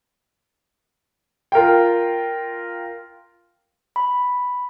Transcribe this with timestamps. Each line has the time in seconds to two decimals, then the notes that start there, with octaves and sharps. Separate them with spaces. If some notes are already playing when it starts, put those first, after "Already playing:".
1.52 F4 A#4 F5 G5
3.96 B5